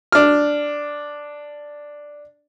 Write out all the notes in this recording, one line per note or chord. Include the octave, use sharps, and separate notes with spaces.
D4 F6